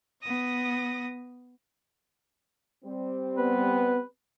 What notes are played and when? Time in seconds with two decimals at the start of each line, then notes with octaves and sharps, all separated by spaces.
0.23 B3 D#6 A#6
2.84 G3 C4
3.37 B3 B4